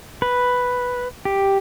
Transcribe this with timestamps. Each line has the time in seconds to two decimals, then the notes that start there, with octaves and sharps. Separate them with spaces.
0.22 B4
1.25 G4